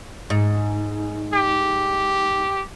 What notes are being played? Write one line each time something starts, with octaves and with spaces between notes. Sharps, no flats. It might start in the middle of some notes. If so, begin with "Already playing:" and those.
G#2
G4